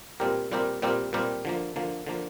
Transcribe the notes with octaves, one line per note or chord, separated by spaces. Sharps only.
A#2 G3 C4 G4 A#4
A#2 G3 C4 G4 A#4
A#2 G3 C4 G4 A#4
A#2 G3 C4 G4 A#4
D3 F3 A#3
D3 F3 A#3
D3 F3 A#3